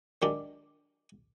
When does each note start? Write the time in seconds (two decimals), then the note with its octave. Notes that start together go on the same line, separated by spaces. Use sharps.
0.22 D#3 F#3 G#3 D4 G4 D5